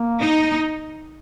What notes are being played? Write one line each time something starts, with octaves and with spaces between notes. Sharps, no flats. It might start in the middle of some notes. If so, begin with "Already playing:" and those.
Already playing: A#3
D#4